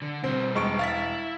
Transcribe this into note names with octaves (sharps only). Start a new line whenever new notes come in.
D3
B2 G3 C4
E1 G#3 C#6 D7
E4 F5 A6 B6